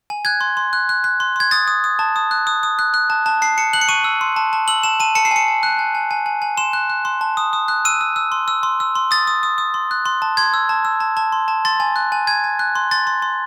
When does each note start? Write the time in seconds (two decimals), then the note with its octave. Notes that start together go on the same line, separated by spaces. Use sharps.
0.10 G#5
0.25 F#6 G#6
0.41 C6
0.57 C6
0.73 F#6
0.89 F#6
1.04 F#6
1.20 C6
1.36 C6 G#6
1.51 D#6 A6
1.67 D#6
1.84 D#6
1.99 A5
2.16 D#6
2.31 F#6
2.47 D#6
2.63 D#6
2.79 F#6
2.94 F#6
3.10 A5
3.26 A5
3.42 A5 C7
3.58 A5 C#7
3.73 F#6 F#7
3.81 C#7
3.89 C#6 D#7
4.04 E6
4.21 C6
4.36 A5
4.53 A5
4.68 E6 F#7
4.83 A5 E7
5.00 A5 D#7
5.15 A5 C#7
5.25 C7
5.31 G#5 C#7
5.48 G#5
5.63 F#6
5.79 G#5
5.95 G#5
6.11 G#5
6.26 G#5
6.42 G#5
6.57 C6 E7
6.73 F#6
6.90 F#6
7.05 C6
7.21 A5
7.37 D#6
7.53 D#6
7.68 F#6
7.85 E6 D#7
8.01 E6
8.16 E6
8.32 C6
8.48 E6
8.63 C6
8.80 E6
8.96 C6
9.11 D#6 A6
9.27 D#6
9.43 D#6
9.58 D#6
9.74 C6
9.91 F#6
10.06 C6
10.22 A5
10.37 C6 G#6
10.54 E6
10.69 A5
10.85 E6
11.00 A5
11.17 A5
11.32 C6
11.48 A5
11.65 C6 A6
11.80 G#5
11.96 F#6
12.12 G#5
12.27 G#5 G#6
12.44 G#5
12.59 F#6
12.75 C6
12.91 C6 A6
13.07 C6
13.22 C6